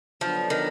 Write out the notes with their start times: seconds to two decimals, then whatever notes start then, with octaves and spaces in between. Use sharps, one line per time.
0.21 D3 F3 F#3 B3 D4
0.50 D#3